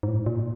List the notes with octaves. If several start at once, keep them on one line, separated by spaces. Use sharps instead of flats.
G#2
A2
A#2